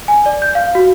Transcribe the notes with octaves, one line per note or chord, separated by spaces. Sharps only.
G#5
D5
G6
F5
F#4